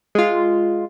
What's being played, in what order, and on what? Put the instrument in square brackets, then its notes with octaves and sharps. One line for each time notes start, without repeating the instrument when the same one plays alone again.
[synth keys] G#3 F4